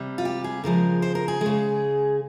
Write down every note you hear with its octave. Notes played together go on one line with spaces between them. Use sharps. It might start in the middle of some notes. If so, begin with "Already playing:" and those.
Already playing: C3 G3
F4
G4
G#4
C#3 F3 G#3 A#4
C5
A#4
G#4
C#3 G#3